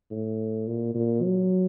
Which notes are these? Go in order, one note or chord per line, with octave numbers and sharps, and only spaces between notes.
A2
A#2
A#2
F#3